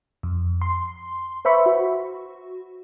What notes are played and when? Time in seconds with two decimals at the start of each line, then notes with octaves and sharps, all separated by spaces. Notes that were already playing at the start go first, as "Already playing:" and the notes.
0.23 F2
0.62 C6
1.45 B4 C5 E5 B5 C#6
1.66 F#4